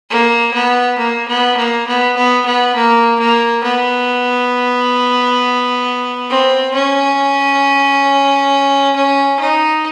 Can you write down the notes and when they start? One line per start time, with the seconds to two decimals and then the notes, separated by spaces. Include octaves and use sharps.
0.10 A#3
0.53 B3
0.98 A#3
1.28 B3
1.57 A#3
1.87 B3
2.17 B3
2.45 B3
2.76 A#3
3.19 A#3
3.64 B3
6.30 C4
6.74 C#4
8.96 C#4
9.40 D#4